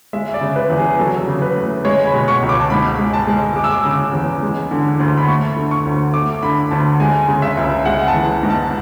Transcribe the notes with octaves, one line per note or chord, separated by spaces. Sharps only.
G#3 E5
D5
C#3
B4
E2
G#4
F#3 A4
C#3
B4
A3
G#3 C#5
B5
B2
C#6
C#2
D6
A5
G#2 B5
G#3
A5
G#3
G#3 D6
E6
D6
C#3
E2
G#3
D3
D2
B5
A3 C#6
D3
C#6
D2
A3 D6
D3 B5
D2 A5
G#3 G#5
C#3
E5
C#2
G#3 F#5
A5
E3
G#2
A5